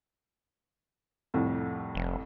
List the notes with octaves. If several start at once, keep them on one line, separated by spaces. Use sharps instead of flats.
C2 F2 A2
F1